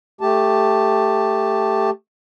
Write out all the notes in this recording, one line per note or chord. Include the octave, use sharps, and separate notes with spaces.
A3 G4 A5